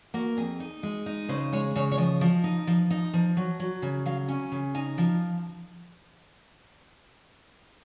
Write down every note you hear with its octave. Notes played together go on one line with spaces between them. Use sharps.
A#3 F#4
F2 G#4
D#4
G#3
D#4
C#3 C5
G#3 C#5
C#3 C#5
C#5
F3 D#5
F3
D#4
F3
D#4
F3
F#3
F#3
C#3
F#3 F5
C#4
C#3
D#4 G#5
F3